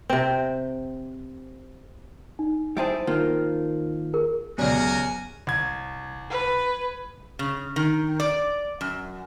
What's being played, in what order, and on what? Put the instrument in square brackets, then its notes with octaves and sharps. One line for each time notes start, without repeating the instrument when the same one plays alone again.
[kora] C3 C4
[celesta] D#4
[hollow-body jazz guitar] G3 E4 G#4 [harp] C5 A5 D7
[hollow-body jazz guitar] D#3 A#3 [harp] F4
[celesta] G#4 A#4
[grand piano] C#2 F#2 [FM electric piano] B3 G4 D5 [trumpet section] F#4 A#4 [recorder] G#5
[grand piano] C2 G#6
[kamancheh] B4
[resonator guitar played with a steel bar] C#3
D#3
D5
F#2